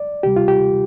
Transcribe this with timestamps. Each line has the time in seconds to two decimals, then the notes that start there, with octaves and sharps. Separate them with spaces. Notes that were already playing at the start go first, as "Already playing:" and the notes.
Already playing: D5
0.23 D2 C3 G3 G4
0.36 F4
0.48 G4